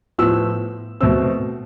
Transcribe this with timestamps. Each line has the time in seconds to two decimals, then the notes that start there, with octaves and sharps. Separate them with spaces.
0.18 A2 F3 B3 E6
1.01 B2 A3 C4 E6